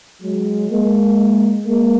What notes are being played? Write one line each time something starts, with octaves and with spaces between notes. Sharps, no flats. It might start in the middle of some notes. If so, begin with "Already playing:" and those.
F#3 G#3
G#3 A#3
G#3 A#3